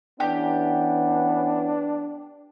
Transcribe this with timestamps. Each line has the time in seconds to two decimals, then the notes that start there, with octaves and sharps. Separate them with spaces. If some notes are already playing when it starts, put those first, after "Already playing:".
0.20 E3 B3 C#4 D4 G4